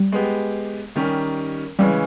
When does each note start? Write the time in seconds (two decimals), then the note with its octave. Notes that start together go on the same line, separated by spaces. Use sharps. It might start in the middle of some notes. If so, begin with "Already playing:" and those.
Already playing: G3
0.12 G#3 B3 G4
0.96 D#3 G3 C#4 G4 A#4
1.79 C#3 E3 G3 G#3 C#4